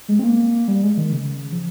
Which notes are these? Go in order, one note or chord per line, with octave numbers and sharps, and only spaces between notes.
G#3
C4
A#3
G3
G#3
D#3
C#3
F3